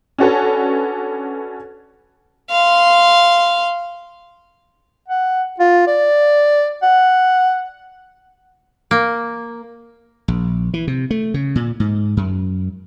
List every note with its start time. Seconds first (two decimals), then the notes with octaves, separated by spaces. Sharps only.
0.18 C#4 D4 F#4 A4 B4 C#5
2.50 F5 C6
5.08 F#5
5.60 F4
5.87 D5
6.83 F#5
8.91 A#3
10.28 A#1
10.74 E3
10.87 C3
11.11 A3
11.34 C#3
11.55 A#2
11.80 G#2
12.17 F#2